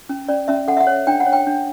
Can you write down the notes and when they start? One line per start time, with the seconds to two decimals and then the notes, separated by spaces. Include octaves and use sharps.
0.09 C#4
0.29 C#4 D5
0.48 C#4 E5
0.68 A4 F#5
0.77 E5
0.80 F#5
0.87 C#5
1.07 D4 G5
1.20 F#5
1.26 C#5
1.33 G5
1.47 D4